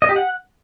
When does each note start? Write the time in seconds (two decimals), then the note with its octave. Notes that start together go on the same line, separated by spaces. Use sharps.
0.02 D#5
0.09 G4
0.16 F#5